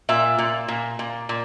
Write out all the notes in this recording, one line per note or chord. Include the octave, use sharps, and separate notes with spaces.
A#2 E5
A#2
A#2
A#2
A#2